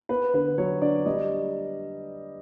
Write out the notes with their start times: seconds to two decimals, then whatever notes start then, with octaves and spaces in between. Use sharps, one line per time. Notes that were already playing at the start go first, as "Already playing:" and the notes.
0.09 B3 B4
0.34 D3 B4
0.58 F#3 C#5
0.81 D4 D5
1.06 G3 D#5